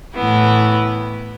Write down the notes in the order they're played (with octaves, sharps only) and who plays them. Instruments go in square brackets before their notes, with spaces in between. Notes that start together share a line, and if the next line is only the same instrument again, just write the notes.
[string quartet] A2 E3 B3 E4